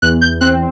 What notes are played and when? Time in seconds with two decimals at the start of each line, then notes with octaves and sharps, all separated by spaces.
0.02 E2 F#6
0.21 G6
0.41 C4 F#6